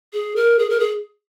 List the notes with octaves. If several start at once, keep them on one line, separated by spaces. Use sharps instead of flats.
G#4
A#4
G#4
A#4
G#4